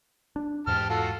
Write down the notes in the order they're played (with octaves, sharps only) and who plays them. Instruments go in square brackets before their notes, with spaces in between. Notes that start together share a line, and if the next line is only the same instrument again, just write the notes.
[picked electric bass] D4
[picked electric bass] E2 G#2 [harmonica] G4 A5 F6
[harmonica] F4 F#4 A4